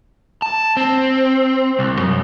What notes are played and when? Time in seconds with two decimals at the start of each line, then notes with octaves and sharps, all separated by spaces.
0.42 A5
0.77 C4
1.79 C2
1.99 F#2